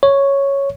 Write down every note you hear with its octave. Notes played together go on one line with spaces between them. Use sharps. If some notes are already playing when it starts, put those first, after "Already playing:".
C#5